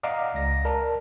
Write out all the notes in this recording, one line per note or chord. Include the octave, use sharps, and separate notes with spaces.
D5 D#5 F5 F#5 A#5 D6
C#2 A#6
A#4 D5 A5 A#5